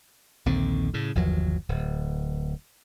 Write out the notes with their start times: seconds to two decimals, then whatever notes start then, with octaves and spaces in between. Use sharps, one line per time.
0.46 A#1 D#2 D3 C4
0.94 A2 C#3
1.15 G1 D#2 F3 F#3
1.69 D1